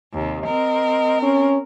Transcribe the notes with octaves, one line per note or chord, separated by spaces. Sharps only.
D#2 C3
C4 A#4 D#5
C#4